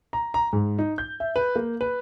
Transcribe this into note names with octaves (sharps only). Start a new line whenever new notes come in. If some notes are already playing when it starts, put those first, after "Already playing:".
A#5
A#5
G#2
D#4
G6
E5
B4
A#3
B4